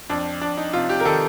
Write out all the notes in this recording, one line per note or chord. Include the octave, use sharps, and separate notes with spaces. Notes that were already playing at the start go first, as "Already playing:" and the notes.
F2 D4
F2 D4
D#4
C3 F4
G4
A#4
D#3 A4